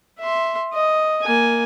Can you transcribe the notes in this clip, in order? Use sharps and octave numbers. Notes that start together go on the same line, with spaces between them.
E5 C6
D#5
A#3 G#5